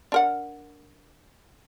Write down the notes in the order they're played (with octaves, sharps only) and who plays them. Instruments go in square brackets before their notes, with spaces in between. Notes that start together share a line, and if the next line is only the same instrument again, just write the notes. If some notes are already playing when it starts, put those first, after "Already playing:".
[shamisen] D4 A#4 F#5